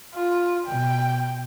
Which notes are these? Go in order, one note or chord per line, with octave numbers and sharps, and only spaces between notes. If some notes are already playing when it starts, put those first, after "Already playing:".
F4
B2 G5